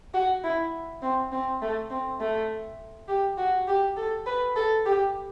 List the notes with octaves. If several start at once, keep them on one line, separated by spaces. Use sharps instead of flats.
F#4
E4
C4
C4
A3
C4
A3
G4
F#4
G4
A4
B4
A4
G4